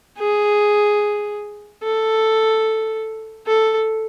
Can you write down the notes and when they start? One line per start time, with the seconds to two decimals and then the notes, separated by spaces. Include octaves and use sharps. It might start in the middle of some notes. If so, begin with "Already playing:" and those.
0.18 G#4
1.83 A4
3.47 A4